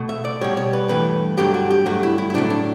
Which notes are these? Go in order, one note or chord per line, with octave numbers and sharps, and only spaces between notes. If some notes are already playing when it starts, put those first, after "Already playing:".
Already playing: B2 A3
E5
D5
B2 G3 C#5
C#5
B4
G2 E3 A3 B4
G2 D3 F#3 A3 G4
F#4
G4
G2 F#3 A3 F#4
E4
E4
E4
A2 F#3 A3 D4
D4